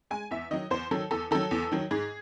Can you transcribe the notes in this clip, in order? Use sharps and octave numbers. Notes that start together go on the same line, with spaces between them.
G#3 G#5
E2 E5
D#3 F#3 D#5
E2 C5
D#3 F#3 A4
E2 A4
D#3 F#3 A4
E2
D#3 F#3
G#2 G#4